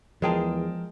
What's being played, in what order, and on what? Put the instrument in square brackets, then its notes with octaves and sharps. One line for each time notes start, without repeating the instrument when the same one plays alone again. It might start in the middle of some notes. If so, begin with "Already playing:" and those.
[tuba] E2 [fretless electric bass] F3 [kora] G#3 G#4 F5 [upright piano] A#4 G5 A5